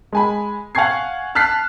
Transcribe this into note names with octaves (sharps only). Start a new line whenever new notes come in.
G#3 G#5 B5
F5 F#5 G#5 C#6 G#6 C7
A5 F6 F#6 B6 C7